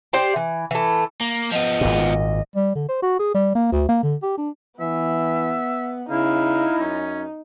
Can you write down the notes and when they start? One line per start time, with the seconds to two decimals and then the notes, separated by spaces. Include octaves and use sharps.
0.13 G4 C5 D5 G5
0.36 E3
0.71 E3 A3
1.21 A#3
1.52 F3 B3 D#5
1.81 G#1 A#2
2.56 G3
2.75 D3
2.89 C5
3.02 F#4
3.19 G#4
3.34 G3
3.55 A#3
3.72 D2
3.89 A#3
4.03 D3
4.23 G4
4.38 D4
4.80 E3 B3 E5
6.10 C#3 D#4 E4 F5
6.79 F#2 C#4